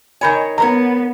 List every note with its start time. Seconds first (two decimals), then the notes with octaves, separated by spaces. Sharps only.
0.21 D#3 A#4 C#5 G#5 B5 G6
0.58 B3 A#4 C5 C#5 A#5